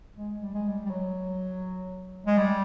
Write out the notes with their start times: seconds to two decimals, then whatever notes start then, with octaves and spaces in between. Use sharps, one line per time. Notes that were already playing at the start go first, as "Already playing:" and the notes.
0.16 G#3
0.41 G3
0.54 G#3
0.68 G3
0.85 G3
0.90 F#3
2.26 G#3
2.37 G3